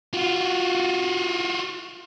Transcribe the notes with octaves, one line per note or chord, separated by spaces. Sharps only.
F4 F#4